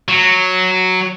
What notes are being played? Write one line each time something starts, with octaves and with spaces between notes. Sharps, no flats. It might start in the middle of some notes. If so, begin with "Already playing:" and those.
F#3